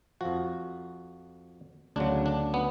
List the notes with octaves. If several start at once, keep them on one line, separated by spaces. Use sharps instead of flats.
F2 F3 F#4
D2 C#3 F#3 D4
D4
B3